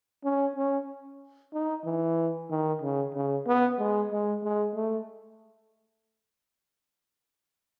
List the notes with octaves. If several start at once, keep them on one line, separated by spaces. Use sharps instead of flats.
C#4
C#4
D#4
E3
D#3
C#3
C#3
B3
G#3
G#3
G#3
A3